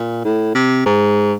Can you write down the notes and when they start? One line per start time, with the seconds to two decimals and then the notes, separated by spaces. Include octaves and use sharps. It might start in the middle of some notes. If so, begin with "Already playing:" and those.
Already playing: A#2
0.24 A2
0.54 C3
0.85 G#2